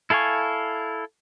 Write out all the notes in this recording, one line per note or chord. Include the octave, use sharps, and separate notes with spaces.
E4 A4 F5 G#5 C#6